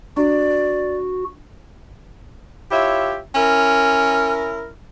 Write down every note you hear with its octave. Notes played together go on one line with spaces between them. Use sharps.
D4 F#4 D5
E4 F4 G4 C#5 E5
C#4 E4 A#4